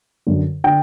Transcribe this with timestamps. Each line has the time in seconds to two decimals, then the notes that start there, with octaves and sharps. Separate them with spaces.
0.27 F#2 D3
0.64 D3 G5